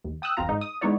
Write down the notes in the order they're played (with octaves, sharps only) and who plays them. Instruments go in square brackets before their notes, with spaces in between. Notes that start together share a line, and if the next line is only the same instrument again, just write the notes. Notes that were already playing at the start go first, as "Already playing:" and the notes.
[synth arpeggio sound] D#2
G5 D#6 E6 F#6
G1 E2 C4 F4 A#5
G#2 D#4 D#5
D#6
G#3 B3 D#4 E4 C#5 D5